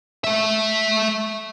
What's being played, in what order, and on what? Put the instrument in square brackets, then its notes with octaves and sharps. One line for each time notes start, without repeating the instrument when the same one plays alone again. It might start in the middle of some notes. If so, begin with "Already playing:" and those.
[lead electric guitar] A3 E5